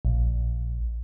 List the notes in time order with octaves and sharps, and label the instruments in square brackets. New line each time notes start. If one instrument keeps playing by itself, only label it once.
[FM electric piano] A#1